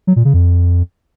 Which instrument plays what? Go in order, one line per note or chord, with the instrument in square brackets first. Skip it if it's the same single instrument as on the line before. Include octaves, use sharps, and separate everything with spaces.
[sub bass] F#3
A#2
C#3
F2